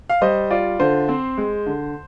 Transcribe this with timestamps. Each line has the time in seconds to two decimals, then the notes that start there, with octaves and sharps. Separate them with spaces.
0.09 F5
0.21 G3 C5 D#5
0.50 F4 D5
0.80 D3 C5
1.09 C4
1.38 G#3
1.66 D3